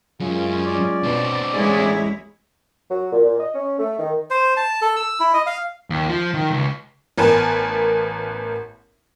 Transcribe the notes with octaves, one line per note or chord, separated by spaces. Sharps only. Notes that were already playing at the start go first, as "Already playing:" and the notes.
F#2 G#3 C#4 F4
D5
B2 C4 D4
A1 E2 G#3 E4 G#4 C#5
F#3
A#2
A#2
D#5
C#4
A3
D#3
C5
A5
A4
E6
E4
D#5
F5
D#2
F3
D#3
C#2
A1 B3 A#4 B4 G#5 A5